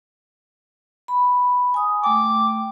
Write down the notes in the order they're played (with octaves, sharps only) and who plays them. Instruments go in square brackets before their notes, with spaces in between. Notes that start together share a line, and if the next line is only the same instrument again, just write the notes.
[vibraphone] B5
G#5 D#6
[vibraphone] A3 G5 [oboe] D6